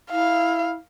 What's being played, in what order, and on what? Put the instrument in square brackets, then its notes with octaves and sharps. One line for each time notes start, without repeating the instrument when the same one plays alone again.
[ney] E4 [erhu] F5